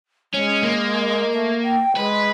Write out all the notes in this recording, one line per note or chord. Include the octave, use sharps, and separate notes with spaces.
G#3 C#4
A#3
A3
G5
G#3 B4